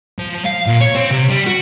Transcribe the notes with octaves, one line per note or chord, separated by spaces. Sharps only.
F3
F5
A#2
C#5
C4
C3
G3
F#4